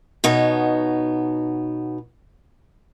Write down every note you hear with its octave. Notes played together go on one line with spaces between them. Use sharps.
B2 B3 D#4 C#5